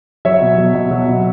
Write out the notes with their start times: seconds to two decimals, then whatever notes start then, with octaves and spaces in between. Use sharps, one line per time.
0.25 F#3 C#5 E5
0.42 B2
0.58 F#3
0.75 B2
0.91 F#3
1.08 B2